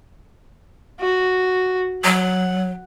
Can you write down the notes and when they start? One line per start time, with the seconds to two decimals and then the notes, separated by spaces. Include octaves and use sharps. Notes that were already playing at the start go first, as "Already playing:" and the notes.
1.00 F#4
2.04 F#3 F#5